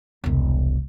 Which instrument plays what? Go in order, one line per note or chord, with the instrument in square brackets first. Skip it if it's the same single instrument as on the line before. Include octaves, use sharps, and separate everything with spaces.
[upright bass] E1 C2